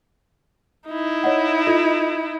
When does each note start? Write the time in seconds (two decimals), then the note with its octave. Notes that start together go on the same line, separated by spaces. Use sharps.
0.88 D#4 E4
1.24 C#5 D#5 F#5
1.67 F4 A4 D#5